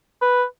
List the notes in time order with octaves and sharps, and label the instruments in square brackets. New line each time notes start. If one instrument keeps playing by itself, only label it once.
[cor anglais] B4